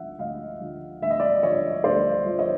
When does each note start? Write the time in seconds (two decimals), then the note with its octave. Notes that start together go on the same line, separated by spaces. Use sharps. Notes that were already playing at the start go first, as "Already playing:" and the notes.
Already playing: D2 D3 F3 E5 F#5
0.19 D2 D#5 F5
0.61 D3 F3
1.01 D2 E5
1.10 D#5
1.20 D5 E5
1.43 D3 F3 C#5 D#5
1.84 D2 C5 D5
2.26 D3 F3
2.39 C#5 D#5